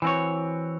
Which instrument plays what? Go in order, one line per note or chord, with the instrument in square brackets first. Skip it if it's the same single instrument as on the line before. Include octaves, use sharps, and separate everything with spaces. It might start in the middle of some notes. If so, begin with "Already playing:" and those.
[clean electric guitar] E3 C4 F#4 C#5